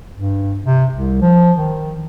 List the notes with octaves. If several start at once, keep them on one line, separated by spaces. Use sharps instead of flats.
G2
C3
C2
F3
D#3